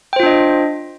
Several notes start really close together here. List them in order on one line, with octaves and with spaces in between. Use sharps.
G5 C5 F4 D4 D#5